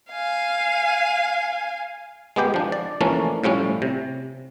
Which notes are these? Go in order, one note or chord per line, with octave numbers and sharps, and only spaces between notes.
F5 G#5
G#3 B3 G4 G5
F3 D4
D5
E3 F3 A3 A#3 C#4 D4
A2 F3 G3 C#4
C3